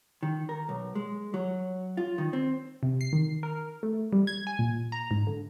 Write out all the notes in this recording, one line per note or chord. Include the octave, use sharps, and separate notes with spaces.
D#3
A#4
B1
G#3
F#3
F4
D#3
C4
C3
C7
D#3
A#4
A3
G3
G#6
G#5
A#2
A#5
G#2
D3